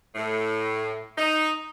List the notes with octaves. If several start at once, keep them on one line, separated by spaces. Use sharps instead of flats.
A2
D#4